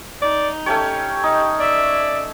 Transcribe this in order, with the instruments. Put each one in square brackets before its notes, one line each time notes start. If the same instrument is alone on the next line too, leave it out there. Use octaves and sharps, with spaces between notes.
[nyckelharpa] D#4 [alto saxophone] D5
[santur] A3 C#4 C#5 [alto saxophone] G4
[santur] D#4
[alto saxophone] D5 [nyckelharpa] E5